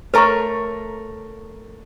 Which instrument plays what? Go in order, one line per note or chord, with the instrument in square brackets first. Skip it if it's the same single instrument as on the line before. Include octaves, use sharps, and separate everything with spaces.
[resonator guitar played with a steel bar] A3 A#4 C#5 [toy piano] B4 A#5 C#6